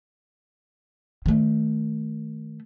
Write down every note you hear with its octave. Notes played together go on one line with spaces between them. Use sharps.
D#3 A3